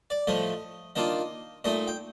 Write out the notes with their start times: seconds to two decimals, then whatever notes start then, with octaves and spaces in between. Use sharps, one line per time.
0.10 D5
0.27 A2 F3 A3 D#5
0.96 D#3 A#3 D4 F4 D#5
1.64 A#2 A3 D#4 D#5
1.88 G5